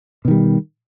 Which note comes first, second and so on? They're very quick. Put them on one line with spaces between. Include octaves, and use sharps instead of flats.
B2 D#3 G3